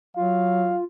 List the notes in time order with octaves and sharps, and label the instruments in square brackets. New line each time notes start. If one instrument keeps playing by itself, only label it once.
[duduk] F#3 [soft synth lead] F4 [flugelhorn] F5